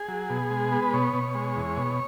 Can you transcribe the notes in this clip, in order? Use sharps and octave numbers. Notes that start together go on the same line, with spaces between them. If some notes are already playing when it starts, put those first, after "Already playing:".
Already playing: G#4
F#3
B2
G#3
B3
B4
B2 C#5
B2
G#3
E2
B2